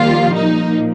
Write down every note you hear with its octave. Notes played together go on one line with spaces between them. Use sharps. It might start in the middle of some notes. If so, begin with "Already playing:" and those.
Already playing: D#3 F3 G3 A#3 F4
A#2 F3 A#3 D#4